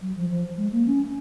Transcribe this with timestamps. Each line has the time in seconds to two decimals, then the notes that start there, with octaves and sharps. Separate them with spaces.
0.02 F#3
0.16 F3
0.30 F3
0.58 G#3
0.72 A#3
0.86 C#4